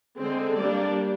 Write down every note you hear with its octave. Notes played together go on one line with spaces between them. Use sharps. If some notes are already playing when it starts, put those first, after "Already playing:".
D3 G#3 C4
G3 A#3 D4 D5